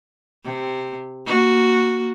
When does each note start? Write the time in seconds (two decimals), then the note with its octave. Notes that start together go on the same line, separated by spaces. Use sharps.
0.44 C3
1.26 A#3 F#4